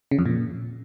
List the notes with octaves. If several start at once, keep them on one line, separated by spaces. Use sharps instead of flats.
C#3
F2
A#2